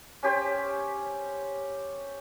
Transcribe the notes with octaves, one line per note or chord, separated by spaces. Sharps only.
C#4 G4 C5